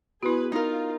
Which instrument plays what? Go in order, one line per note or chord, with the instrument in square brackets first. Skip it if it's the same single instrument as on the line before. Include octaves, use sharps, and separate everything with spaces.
[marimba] B3 [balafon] E4 F#4 [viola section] G#4 B4
[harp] D#4 A#4 [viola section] F4